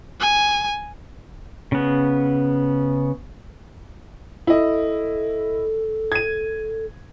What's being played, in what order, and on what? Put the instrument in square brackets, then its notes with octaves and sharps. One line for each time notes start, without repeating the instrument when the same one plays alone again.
[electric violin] G#5
[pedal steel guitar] C#3 B3
[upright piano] E4 D#5 [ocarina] A4
[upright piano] G#6 D#7